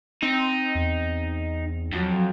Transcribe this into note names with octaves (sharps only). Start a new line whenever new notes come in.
C4 D#4
E2
F2 F#3